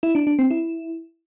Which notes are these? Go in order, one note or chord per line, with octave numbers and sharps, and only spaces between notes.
E4
D4
D4
C4
E4